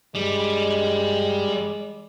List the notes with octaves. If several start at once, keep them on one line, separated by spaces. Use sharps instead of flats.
G2 G3 G#3